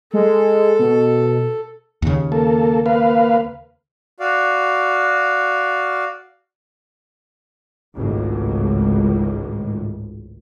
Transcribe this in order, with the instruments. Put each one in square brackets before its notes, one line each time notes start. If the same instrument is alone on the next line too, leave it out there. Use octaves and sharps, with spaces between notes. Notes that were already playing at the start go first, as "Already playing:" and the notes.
[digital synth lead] G#3 [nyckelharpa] A4
[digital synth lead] B2
[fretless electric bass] D#2 C#3
[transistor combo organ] A#3 A4
A#3 B4 F5
[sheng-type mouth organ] F#4 D5 F5
[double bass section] G#1 C#2 A2